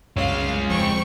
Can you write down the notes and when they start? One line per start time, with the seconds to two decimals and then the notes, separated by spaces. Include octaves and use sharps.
0.17 C2 F#2 G#3 C#5 F5
0.69 D#1 F3 C4 G5 C#6